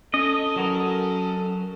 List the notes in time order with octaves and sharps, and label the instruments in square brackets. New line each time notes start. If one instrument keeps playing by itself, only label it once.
[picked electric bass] C#4 [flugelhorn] A4 [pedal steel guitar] D#5
[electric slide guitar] F#3 F#4 A#4